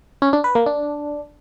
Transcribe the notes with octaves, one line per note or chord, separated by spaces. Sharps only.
C#4
D4
B4
A#3
D4